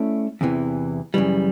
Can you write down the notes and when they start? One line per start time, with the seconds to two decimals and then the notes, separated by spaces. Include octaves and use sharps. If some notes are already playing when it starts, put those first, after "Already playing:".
Already playing: A3 C#4 E4 A4 D5
0.41 E2 C3 E3
1.14 F#2 C#3 E3 G3